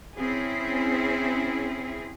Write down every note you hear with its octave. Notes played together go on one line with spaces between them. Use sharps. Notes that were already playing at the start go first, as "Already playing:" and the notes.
C4 C#4 E4 G#4